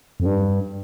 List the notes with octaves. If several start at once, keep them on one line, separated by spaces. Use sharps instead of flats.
F2
G2